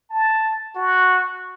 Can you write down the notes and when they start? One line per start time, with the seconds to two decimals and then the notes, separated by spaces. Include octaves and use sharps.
0.10 A5
0.75 F#4